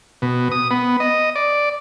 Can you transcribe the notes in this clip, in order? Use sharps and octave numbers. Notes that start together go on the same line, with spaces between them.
B2
D#6
B3
D#5
D5